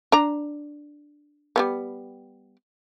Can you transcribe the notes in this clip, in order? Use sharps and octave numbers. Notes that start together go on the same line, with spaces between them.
D4 A#5
G3 A3 B3